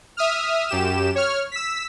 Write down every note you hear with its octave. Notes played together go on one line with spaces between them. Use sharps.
E5 D#6 F6
F#2 G4 E7
C#5 F6
E6 B6